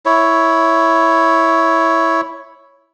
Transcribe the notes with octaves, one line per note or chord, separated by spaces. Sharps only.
E4 C#5